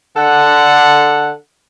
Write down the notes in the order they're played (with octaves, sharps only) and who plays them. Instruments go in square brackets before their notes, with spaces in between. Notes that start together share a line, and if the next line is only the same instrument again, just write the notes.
[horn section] D3 A4 F#5